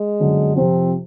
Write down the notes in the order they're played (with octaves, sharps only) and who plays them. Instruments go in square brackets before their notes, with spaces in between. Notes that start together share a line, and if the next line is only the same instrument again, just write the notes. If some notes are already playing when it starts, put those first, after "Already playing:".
Already playing: [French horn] G#3
[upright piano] G1 F#2 D3
[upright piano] F2 C3 F3 [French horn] C4